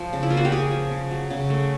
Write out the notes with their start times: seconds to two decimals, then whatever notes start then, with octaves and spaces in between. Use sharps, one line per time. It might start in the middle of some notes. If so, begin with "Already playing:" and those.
Already playing: F3
0.13 C#3
0.23 E4
0.30 A#3 F4
0.37 F#4
0.45 G4
0.52 C#3 G#4
0.71 F3
0.91 C#3
1.11 F#3
1.31 C#3
1.50 A3